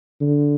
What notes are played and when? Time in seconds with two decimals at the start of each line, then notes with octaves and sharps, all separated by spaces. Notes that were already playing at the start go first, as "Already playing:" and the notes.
0.21 D3